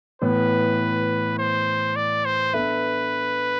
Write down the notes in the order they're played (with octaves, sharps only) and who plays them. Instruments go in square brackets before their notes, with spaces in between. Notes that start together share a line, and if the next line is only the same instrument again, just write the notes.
[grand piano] A2 E3 B3 [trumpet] B4
[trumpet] C5
D5
C5
[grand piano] B3 D4 A4 E5 [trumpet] B4